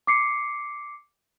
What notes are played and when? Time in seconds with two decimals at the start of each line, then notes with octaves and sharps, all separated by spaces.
0.07 D6 C7 C#7